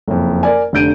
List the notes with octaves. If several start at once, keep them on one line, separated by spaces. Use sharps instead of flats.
F#1 F2
A#4 D5 G#5
F1 D3 G6 D7 D#7